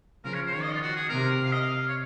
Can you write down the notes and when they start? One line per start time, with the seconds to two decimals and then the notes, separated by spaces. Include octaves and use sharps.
0.24 C#3 F3 A#4
0.34 C#5
0.46 C5
0.53 D#3 C#5
0.62 D#5
0.72 F4
0.81 F#4
0.96 G#4
1.09 C3 A#4
1.45 F5
1.52 D#5
1.60 F5
1.88 C#5